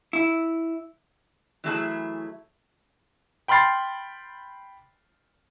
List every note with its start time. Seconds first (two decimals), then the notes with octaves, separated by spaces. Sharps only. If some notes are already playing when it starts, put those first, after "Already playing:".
0.13 E4
1.64 E3 F#3 A3 E4 G#4 A5
3.48 G5 B5 C6 F6 A6 C7